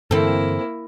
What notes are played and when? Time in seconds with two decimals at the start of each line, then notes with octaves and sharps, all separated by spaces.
0.11 G2 D3 E3 A#3 C4 E4 A4